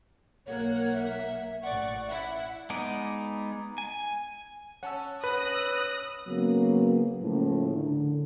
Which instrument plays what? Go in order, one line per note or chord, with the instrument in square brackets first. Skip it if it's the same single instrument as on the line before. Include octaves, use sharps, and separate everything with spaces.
[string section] B1 A#3 F#5 [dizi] C#5
[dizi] E5
[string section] A1 D5 C#6 [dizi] F#5
[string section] E4 F#5 [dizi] E5
[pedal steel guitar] G#3 B3 D#4 D5
G#5
[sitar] C#4 [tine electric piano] F#5 A5 E6
[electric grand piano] B4 [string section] D#6 F#6 A#6
[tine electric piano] B5 E6
[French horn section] C#3 F#3 A#3 B3
A2 C#3 F3 A#3
D3